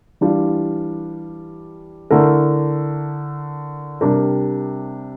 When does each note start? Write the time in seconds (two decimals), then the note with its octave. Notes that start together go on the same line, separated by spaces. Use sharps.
0.21 E3 G3 D4 F4
2.11 D3 A3 E4 A#4
4.01 C3 G3 D4 G4 A#4